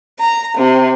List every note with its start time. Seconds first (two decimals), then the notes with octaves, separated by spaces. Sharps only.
0.19 A#5
0.57 C3